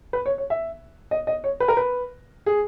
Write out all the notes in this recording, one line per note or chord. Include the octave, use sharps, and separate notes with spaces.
B4
C#5
C#5
E5
D#5
D#5
C#5
B4
A#4
B4
G#4